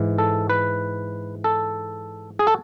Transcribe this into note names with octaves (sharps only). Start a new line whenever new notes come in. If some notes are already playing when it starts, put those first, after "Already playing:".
Already playing: G#2 E3
A4
B4
A4
G#4
A4